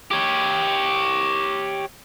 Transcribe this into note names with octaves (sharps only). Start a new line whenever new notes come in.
G4 C#5